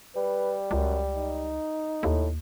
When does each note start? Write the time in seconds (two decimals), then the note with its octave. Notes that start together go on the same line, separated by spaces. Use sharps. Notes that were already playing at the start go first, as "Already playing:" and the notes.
0.16 G3 B4
0.71 C#2 F#2
1.15 D#4
2.03 D#2 A2